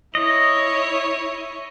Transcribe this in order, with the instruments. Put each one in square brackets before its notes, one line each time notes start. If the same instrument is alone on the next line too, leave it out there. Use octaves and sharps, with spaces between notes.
[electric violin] E4 C#5 [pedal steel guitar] D#5